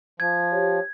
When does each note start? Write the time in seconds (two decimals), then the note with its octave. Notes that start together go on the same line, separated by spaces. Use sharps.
0.20 F3 G#6
0.52 G4 C#5